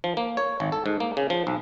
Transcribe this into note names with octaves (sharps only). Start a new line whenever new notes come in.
F3
A#3
C#5
G#1
A4
G#2
A#3
C#3
F3
B1